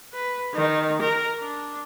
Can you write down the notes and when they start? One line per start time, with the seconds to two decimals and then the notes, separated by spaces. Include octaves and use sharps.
0.13 B4
0.54 D#3
1.01 A#4
1.40 D4